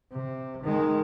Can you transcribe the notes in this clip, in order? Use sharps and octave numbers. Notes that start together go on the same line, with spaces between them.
C3
D#3 G#3